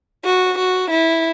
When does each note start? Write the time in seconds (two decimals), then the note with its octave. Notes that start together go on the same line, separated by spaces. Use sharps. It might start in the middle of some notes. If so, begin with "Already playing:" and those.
0.25 F#4
0.58 F#4
0.91 E4